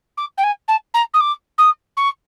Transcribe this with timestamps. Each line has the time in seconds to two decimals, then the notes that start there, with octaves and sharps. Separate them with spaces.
0.17 D6
0.38 G5
0.43 G#5
0.68 A5
0.94 A#5
1.14 D#6
1.20 D6
1.58 D#6
1.97 C#6